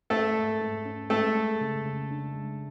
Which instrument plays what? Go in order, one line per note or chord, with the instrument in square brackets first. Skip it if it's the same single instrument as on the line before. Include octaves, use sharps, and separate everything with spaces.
[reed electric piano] G#2 [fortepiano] A3 A4
[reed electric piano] G#2
G#2
C#4
[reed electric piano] G#3 [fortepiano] A3 A4
[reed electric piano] G#3
C#3
C#3
D4
G#3